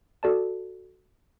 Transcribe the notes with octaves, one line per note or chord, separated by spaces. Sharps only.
F#4 A4 D5 A5